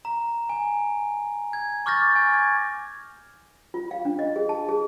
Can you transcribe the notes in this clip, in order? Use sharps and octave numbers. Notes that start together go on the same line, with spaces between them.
A#5
G#5
G#6
C#6 D6 F6 G6 A6 A#6
G#5
G#6
F4
F5
D4
D#5
G#4
A5
G#4